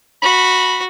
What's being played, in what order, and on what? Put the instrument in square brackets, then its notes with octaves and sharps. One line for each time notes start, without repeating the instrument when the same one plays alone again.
[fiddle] F#4 [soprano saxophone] B5